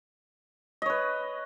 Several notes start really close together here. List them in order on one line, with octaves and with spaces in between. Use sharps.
D#5 C#5 B4